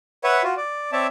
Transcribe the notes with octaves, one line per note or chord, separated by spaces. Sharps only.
B4 C#5 E5 F#5
F4 F#4
D5
C4 C#5 D5 E5 A5